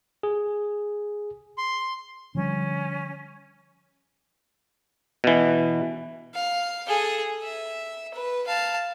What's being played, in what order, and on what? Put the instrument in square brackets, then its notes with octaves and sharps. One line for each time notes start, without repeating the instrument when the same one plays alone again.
[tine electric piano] G#4
[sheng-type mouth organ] C6
[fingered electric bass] D3 F3 G3 [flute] C#4
[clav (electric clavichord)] B2 E3
[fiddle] F5
G#4 A4
E5
B4
F5 A5